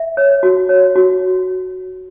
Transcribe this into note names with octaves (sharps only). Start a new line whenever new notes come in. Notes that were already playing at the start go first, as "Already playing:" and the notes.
Already playing: E5
C#5
F#4
C#5
F#4